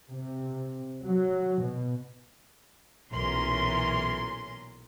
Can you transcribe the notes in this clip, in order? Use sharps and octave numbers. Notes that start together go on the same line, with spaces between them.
C3
F#3
B2
B1 A#2 E3 C#4 A#4 C6